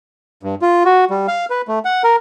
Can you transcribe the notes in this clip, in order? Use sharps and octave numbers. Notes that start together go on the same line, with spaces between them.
G2
F4
F#4
G3
F5
B4
A3
F#5
A#4